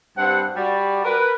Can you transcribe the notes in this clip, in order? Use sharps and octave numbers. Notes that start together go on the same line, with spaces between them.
G2 C4 F#5
G3 F#4 D5
A#4 B4